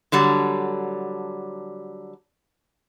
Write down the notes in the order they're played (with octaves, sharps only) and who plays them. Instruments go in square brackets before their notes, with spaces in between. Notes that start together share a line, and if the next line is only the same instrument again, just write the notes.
[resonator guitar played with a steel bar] D3 F#3 G3